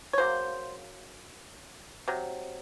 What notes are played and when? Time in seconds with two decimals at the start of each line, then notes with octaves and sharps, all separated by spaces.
0.13 C#5
0.18 C#3 F#3 A#3 C5
2.08 C3 F#3